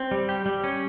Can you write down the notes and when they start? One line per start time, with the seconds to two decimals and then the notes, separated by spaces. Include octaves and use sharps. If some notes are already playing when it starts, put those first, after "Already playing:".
Already playing: C4
0.11 G3
0.29 G4
0.46 G3
0.64 C#4